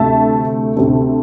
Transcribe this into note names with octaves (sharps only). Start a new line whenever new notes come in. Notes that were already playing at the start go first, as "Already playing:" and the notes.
Already playing: D2 C3 A3 E5 A5
D2 C3 A3